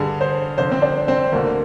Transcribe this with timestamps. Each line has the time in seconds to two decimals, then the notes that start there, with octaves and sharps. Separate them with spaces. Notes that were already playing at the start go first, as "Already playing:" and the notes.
Already playing: G2 D3 G#4
0.21 C5
0.58 F2 D3 C5
0.71 C4
0.82 D4
1.08 C4
1.32 D2 D3 A#3